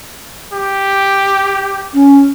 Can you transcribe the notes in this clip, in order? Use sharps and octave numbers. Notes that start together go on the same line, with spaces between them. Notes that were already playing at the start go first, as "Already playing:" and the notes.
G4
C#4